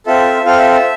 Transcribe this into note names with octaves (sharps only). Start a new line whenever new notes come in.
C4 F4 A4 E5
C4 F4 A4 F5
E5
E5